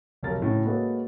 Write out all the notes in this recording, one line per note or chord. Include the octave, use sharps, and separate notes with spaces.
F1 B1 A#4 A6
A2 C#3 C#4
G#3 A#3 F#4 A4 B4 C#5